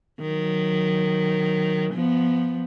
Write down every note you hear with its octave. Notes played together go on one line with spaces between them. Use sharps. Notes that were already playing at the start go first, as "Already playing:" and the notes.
D#3 F#3
F3 B3